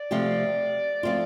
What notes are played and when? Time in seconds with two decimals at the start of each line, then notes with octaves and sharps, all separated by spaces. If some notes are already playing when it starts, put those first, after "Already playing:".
Already playing: D5
0.11 C3 F3 A3 C4 G4
1.03 F3 A3 C4 F4